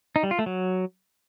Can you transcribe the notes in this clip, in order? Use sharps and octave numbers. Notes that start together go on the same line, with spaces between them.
D#4
G3
F4
A3
F#3